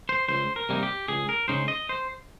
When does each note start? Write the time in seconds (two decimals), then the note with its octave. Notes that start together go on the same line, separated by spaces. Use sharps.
0.09 C5
0.28 C#2 C5
0.56 A#4
0.69 C3 G3 A#3 D#4
0.83 G4
1.08 C#2 G#4
1.29 A#4
1.48 C#3 G#3 D#4 C5
1.68 D#5
1.89 C5